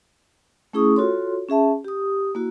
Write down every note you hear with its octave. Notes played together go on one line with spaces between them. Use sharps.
A3 C#4 E4 G#4 C#6 D#6
F4 F#4 A4 C#5 C6
C#4 G#4 E5 A5
G4 D#6
A#3 E4 F#4